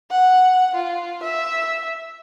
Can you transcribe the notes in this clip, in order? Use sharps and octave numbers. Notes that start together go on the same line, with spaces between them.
F#5
F4
E5